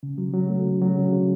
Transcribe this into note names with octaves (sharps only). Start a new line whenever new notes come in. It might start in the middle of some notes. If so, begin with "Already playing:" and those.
C#3
F#3
F#3
A3
C#3
F#3
C#3
C#3